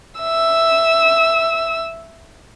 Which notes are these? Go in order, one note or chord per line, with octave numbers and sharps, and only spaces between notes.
E5 E6